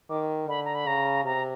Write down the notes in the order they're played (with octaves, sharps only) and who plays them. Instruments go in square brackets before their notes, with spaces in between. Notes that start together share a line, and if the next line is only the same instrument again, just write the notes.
[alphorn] D#3 [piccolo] D6
[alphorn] D3 [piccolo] B5
[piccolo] A#5
B5
[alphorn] C#3 [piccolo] A#5
[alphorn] C3 [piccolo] A#5